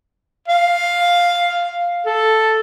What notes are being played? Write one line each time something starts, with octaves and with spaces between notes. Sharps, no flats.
F5
A4